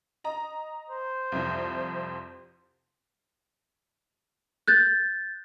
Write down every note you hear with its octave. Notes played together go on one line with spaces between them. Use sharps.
D#5 A#5
C5
C2 F2
F#6 G6 A6